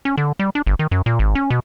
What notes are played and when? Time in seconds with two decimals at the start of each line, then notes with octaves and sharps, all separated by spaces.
0.05 C#4
0.17 D3
0.39 G3
0.55 D4
0.67 G1
0.79 D#3
0.91 F#2
1.06 A#2
1.19 G#1
1.35 C#4
1.50 B2